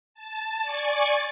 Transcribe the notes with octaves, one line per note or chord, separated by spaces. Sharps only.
A5
D5 G#5 C#6 A6